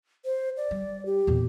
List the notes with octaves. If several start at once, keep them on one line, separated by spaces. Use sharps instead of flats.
C5
D5
G3
G4
E2 A#2